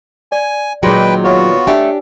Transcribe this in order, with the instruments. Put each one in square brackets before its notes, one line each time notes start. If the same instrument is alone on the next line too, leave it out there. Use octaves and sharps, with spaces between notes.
[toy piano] D5 [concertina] G#5
[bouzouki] A#2 D#3 [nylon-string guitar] F#3 G#3 [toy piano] G#4 [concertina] B4 G5
[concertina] B3 F4 F#4 [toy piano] B4 C#5 E5
[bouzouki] A3 [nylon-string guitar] D4 G4 [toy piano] G#5